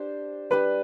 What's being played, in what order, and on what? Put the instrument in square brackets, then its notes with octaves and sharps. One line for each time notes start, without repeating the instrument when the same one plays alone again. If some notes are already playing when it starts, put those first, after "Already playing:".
Already playing: [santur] D4 G4 C5
[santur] G3 D4 G4 [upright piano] B4